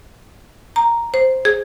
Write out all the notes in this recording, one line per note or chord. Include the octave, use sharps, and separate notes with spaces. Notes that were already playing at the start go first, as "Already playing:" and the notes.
A#5
C5
G#4